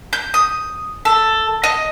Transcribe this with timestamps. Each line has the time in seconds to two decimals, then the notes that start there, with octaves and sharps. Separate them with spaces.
0.13 G6
0.34 D#6
1.05 A4
1.64 D#5